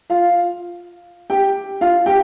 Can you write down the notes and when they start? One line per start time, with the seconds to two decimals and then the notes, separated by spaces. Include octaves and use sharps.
0.10 F4 F5
1.30 G4 G5
1.81 F4 F5
2.06 G4 G5